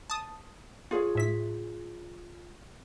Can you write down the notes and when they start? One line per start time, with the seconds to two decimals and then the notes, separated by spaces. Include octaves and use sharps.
0.10 A5 D#6
0.91 F4 G#4 C#5
1.15 A2 E5 B6